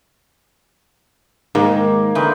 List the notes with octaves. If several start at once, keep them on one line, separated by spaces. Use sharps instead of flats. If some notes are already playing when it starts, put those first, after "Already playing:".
G#2 D#3 A#3
D3 E3 D#4 F4 B4